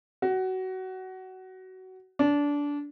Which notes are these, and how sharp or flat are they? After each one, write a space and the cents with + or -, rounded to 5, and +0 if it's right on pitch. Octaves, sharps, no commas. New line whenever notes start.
F#4 +20
D4 -20